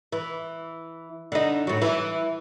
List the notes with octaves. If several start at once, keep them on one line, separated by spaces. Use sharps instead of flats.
E3
D3 D#4
A2 F#3
E3